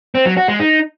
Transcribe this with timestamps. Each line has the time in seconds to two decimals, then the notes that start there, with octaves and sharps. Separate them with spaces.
0.15 C4
0.26 F#3
0.37 F#4
0.48 G#3
0.60 D#4